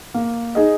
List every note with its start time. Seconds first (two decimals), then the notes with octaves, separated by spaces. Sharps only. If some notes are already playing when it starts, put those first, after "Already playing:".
0.14 A#3
0.55 D#4 G#4 D#5